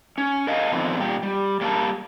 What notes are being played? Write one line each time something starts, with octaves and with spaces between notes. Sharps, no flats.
C#4
A#4 D#5 F5 G#5
D3 D#3 F3 B3 C4
A#2 G3 G5
G3
G3 A#3 A#4 C5 A5